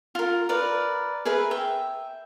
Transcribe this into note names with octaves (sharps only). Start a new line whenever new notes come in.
F4 A#4
A#4 B4 D5
G#4 A#4 B4 E5
E5 G5